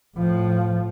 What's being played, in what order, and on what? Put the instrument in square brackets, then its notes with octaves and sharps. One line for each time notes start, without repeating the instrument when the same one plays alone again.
[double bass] A2 F3